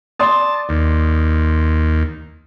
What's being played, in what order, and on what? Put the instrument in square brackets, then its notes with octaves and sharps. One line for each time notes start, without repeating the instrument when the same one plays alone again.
[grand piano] D5 C6 D#6 [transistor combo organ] A5
[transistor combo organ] D#2